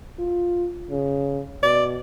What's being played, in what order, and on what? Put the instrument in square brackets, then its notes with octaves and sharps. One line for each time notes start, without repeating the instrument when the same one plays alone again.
[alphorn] F4
C#3
[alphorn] B2 [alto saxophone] D5